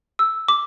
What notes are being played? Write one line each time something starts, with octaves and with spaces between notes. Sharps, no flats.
E6
D6